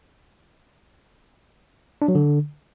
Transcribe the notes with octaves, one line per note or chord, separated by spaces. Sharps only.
D4
F#3
D3